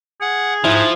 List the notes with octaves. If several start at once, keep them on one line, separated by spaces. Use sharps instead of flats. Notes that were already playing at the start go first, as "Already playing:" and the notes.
G#4 F#5
G#2 F3 E4